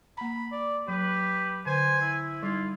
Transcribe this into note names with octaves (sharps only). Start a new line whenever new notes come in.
A#3 A#5 B5
D5
F#3 G4 B4
D3 C5 G#5
E4
G3 D#4 F4